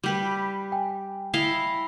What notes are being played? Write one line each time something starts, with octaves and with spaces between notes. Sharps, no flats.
G3 G4 B4
G5 G#5
E4 D#5 F5